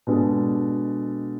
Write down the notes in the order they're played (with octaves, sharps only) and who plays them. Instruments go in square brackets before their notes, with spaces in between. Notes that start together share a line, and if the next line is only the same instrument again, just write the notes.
[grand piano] B2 G#3 D4 A4